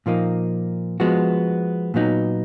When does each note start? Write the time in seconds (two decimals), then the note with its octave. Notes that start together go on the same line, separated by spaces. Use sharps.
0.06 A#2 F3 A#3 D#4
1.00 F3 G#3 B3 F#4
1.94 A#2 F#3 B3 D#4